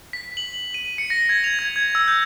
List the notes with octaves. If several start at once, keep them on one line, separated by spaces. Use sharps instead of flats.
B6
F#7
D#7
C#7
A#6
G#6
F7
G#6
G#6
E6
G6